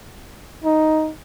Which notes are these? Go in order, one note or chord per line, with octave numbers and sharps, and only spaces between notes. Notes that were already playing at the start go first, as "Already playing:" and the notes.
D#4